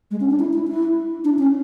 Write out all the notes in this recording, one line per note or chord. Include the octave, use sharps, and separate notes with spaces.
G#3
C#4
D4
E4
E4
E4
D4
C#4